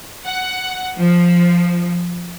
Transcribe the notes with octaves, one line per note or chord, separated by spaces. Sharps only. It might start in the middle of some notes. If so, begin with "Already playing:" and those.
F#5
F3